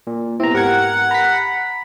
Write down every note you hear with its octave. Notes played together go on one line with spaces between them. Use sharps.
A#2
C3 B3 C4 E4 A#5
G#2 G4 A#4 F#5 G#6
A#5 B5 B6